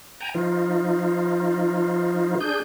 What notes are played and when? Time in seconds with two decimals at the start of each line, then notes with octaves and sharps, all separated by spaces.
0.20 G5 G#5 A#5
0.34 F3 D#4 F4
2.40 D4 G#4 G6